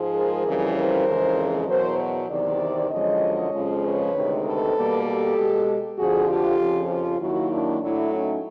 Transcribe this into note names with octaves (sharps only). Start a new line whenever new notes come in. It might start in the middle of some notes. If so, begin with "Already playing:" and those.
Already playing: G#2 F3 G#3
G#4 A#4
F2 C#3 E3 G3
A#4 C5
F2 C#3 E3 G#3
E2 B2 F#3 A#4 C5
E2 C3 D#3 C5 D5
F#2 D3 F3 G#3 C#5 D#5
F2 C#3 F3 G#3
B4 C#5
D2 C3 D#3 G#3
A4 B4
B2 G3 A#3
G4 A4
B2 G#3
F2 D3 F3 F#4 G#4
F4 G4
F2 C#3 F3
F4 G4
D#2 D#3 F#3 A#3 E4 F#4
D4 E4
A2 F#3 A3 D4 E4
C#4 D#4